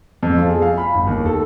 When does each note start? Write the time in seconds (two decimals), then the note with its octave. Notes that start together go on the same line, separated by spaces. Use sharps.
0.23 F2
0.38 F4
0.49 G#4
0.62 F5
0.78 B5
0.95 G1
1.07 D#2
1.26 A4